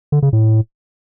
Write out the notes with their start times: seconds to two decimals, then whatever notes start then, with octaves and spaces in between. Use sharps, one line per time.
0.12 D3
0.22 C#3
0.33 A2